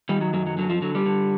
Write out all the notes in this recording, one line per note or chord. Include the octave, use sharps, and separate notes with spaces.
D#3 G3
F#3
F#2 F#3
F#3
D3 F#3
F3
D3 F#3
G3
D3